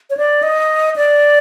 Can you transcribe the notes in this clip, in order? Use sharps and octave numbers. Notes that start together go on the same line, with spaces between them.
C#5
D5
D#5
D5